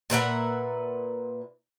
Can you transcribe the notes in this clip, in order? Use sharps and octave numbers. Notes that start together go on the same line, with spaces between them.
A#2 B4 E5 F#5